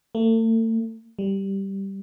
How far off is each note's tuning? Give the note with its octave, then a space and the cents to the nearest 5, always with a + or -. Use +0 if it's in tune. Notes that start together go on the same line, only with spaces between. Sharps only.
A3 +40
G3 -5